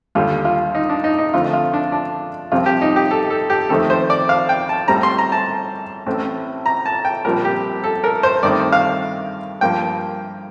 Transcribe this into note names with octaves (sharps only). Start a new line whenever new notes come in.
D#2 D3 G3 F4
F4
D#4
D4
D#4
D#4
F2 D3 A3 C4 F4
F4
D4
D4
C2 C3 F3 C4 F4
G4
D#4
G4
A4
A4
G4
F2 D#3 A3 C4 A4
C5
D5
F5
G5
A5
A2 G3 C4 A#5
C6
A#5
A5
A1 A2 A3 C4
A#5
A5
G5
A#1 A#2 G3 C4 A#4
G4
A4
A#4
C5
G2 D#3 A3 C4 D5
F5
G2 F3 A#3 G5